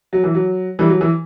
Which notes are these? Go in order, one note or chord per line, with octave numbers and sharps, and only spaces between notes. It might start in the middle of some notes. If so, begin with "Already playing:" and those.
F#3
E3
F#3
E3 G3
F#3
E3